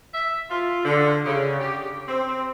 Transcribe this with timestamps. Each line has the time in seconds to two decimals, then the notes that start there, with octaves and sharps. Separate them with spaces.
0.14 E5
0.50 F4
0.85 D3
1.26 C#3
1.60 G4
2.09 C4